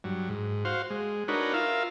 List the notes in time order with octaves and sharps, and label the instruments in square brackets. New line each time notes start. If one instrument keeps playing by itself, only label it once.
[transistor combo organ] G2 F#3
G#2
F#4 C5 F5
G#3
D4 D#4 F#4 A#4 B4 C#5
F4 A#4 E5 F5